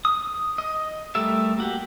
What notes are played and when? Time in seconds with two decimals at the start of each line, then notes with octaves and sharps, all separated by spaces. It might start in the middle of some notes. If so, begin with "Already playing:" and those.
0.05 D#6
0.58 D#5
1.15 G3 A3 A4 A#4 E5
1.58 A#3 F#4 G4